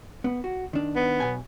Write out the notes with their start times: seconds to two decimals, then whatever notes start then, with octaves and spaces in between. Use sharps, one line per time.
0.24 B3
0.44 F#4
0.73 D#3 D4
0.96 B3
1.20 B1 B2 G#5